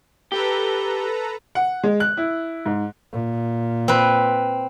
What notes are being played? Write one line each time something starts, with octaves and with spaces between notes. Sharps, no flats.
G4 A4 B4 A#5
F#5
G#3
F#6
E4
G#2
A#2
C4 B4